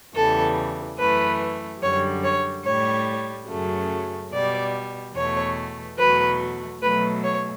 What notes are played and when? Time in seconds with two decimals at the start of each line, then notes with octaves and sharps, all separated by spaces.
0.15 E2 C#3 E3 G3 A4
0.99 F#2 E3 A3 B4
1.82 F#2 D3 G3 C#5
2.24 C#5
2.65 A2 G3 C#5
3.49 F#2 C#3 F#3 A3
4.32 B2 G3 D5
5.15 E2 B2 A3 C#5
5.98 E2 B2 F#3 A3 B4
6.81 B2 F#3 A3 B4
7.24 C#5